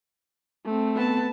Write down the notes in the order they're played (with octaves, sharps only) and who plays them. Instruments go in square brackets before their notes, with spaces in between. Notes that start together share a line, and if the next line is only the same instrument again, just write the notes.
[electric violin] A3 C4
[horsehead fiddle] B3 A5